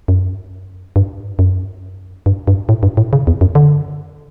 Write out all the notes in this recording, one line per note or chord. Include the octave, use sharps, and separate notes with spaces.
F#2
G2
F#2
G2
G2
A2
G2
A2
C#3
E2
F#2
D3